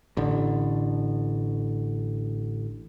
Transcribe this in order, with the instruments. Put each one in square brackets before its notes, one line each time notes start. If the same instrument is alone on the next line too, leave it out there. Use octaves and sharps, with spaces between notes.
[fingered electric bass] A1 D3